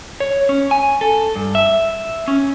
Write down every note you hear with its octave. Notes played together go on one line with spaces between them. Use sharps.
C#5
C#4
G#5
A4
G2
E5
C#4